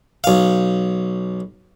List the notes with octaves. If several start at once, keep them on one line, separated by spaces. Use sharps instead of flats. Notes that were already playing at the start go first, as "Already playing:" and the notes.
B1 F5